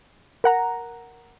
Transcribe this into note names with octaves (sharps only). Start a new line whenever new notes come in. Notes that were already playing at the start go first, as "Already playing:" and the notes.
A#4 F#5 A#5